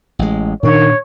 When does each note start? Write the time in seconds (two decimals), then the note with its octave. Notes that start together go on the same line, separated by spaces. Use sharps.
0.19 A1 G#3
0.63 A#2 D#3 D4 C#5